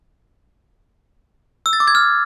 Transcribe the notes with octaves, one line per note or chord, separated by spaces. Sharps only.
E6
A6
D6
G#6
F6